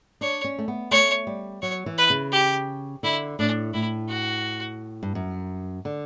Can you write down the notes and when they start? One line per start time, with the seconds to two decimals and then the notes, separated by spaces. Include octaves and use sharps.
0.21 D4 C#5
0.44 C#4
0.59 A3
0.68 B3
0.91 A3 C#5
1.27 G3
1.62 F#3 C#5
1.86 E3
1.98 B4
2.10 C#3
2.32 G4
3.03 D3 E4
3.39 A2 D4
3.73 A2 E4
4.09 F#4
5.03 G2
5.15 F#2
5.85 D3